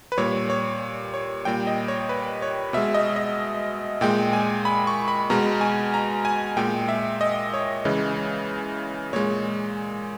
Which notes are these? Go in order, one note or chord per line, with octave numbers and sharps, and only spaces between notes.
B4
A#2 G3 C#5
C#5
C#5
A#2 G3 G5
D#5
C#5
B4
C#5
B2 G#3 E5
D#5
D#5
A#2 G#3 G5
G#5
B5
C#6
B5
B2 G#3 A#5
G#5
A#5
G#5
A#2 G#3 G5
E5
D#5
C#5
C#3 E3 G#3
A#2 G#3 C#5